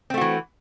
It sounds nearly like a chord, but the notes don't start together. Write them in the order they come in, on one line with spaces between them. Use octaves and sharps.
C4 A3 F#4 E3